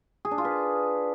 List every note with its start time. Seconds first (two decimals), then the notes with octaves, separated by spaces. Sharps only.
0.25 G#4
0.31 D4
0.38 F4
0.45 B4